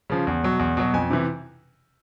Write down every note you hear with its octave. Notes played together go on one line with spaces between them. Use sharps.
C#3 F3
E2
B2 F#3
E2
B2 F#3
F2 G#5
C3 E3